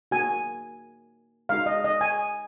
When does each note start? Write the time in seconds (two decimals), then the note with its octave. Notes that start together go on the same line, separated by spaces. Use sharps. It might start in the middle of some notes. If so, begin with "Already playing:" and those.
0.11 A#3 D#4 F#4 G#5
1.49 G#3 D#4 F#4 F5
1.66 D#5
1.84 D#5
2.01 G#5